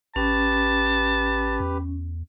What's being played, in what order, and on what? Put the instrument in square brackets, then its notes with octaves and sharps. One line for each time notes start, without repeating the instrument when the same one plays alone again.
[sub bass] A1 [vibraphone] C#4 [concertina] G4 B4 [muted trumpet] A5
[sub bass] E2